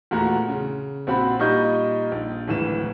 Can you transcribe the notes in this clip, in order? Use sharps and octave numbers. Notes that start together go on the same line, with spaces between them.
E2 A#2 A3 F#4 A#5
C#3
A#1 C4 F#4 B5
A#2 G3 D#4 D#5 C#6 G6
A#1
D1 G#1 E3 E7